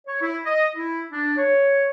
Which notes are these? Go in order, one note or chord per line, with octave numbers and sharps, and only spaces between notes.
C#5
E4
D#5
E4
D4
C#5